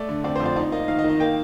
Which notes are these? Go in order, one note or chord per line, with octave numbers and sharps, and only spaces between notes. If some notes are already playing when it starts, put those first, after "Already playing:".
Already playing: A3 D5
D3
C4 D5
C5
F2
D5
D#4 D5
A#3 D#5
D#3 F5
D#5
D#3
D#5
A#3 G5